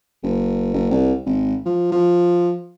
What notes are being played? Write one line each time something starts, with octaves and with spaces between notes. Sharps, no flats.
F#1
F#1
C2
G#1
F3
F3